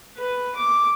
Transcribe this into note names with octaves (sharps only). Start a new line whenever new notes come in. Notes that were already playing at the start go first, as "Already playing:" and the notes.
B4
D6